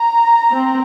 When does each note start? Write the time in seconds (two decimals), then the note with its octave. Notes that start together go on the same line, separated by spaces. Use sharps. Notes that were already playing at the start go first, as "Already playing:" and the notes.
Already playing: A#5
0.52 C4